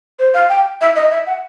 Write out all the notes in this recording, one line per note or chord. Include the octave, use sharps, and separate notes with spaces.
C5
F5
G5
E5
D#5
E5
F#5